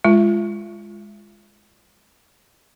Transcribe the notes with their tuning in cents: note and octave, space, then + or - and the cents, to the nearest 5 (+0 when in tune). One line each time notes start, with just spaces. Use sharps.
G#3 +0 F4 -20